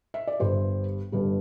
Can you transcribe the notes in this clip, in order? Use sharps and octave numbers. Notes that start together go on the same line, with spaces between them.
E5
D5
G1 G2 G3 C5
G1 G2 G3